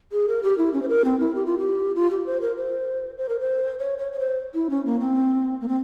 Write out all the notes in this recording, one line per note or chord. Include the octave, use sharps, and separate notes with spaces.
G#4
A#4
G4
E4
C#4
C5
A#4
C4
E4
G4
F4
G4
F4
G4
C5
A#4
C5
C5
A#4
C5
C#5
C#5
C#5
C5
E4
C#4
A#3
C4
A#3
C4